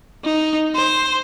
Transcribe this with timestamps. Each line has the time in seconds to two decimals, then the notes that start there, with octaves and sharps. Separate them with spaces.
0.24 D#4
0.75 C5